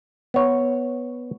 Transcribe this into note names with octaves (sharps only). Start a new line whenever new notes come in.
B3 C#5